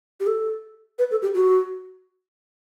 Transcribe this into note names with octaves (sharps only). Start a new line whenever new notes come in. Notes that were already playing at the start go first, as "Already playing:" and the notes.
G4
A4
B4
A4
G4
F#4